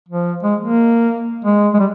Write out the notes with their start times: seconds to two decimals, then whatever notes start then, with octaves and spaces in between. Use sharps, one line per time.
0.09 F3
0.43 G#3
0.60 A#3
1.45 G#3
1.74 G#3
1.79 G3